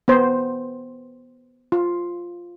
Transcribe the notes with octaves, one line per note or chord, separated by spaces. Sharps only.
B3 C5
F4